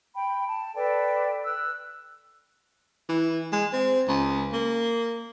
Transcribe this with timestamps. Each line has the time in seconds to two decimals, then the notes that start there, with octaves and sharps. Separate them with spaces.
0.15 G5 B5
0.47 A5
0.76 A4 B4 D5 G5
1.45 E6 F#6
3.09 E3
3.53 G#3
3.73 C4
4.08 C#2
4.53 A#3